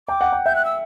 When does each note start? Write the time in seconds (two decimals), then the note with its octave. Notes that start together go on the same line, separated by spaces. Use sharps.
0.08 G5 D6
0.21 F#5
0.32 G5
0.46 E5 G6
0.55 F#6
0.65 E6